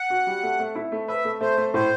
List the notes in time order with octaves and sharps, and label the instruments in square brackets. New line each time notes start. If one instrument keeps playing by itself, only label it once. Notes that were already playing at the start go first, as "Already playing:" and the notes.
Already playing: [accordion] F#5
[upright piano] F#4
G3
A3
A3
E4
A3
[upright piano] B4 [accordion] E5
[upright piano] A3
[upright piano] A3 [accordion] C5
[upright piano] A3
[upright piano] A2 [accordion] C5